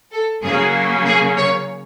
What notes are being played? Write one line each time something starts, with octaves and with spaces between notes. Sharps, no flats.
A4
C#3 F#3 A#3 C#4 G#4
G#4
C#5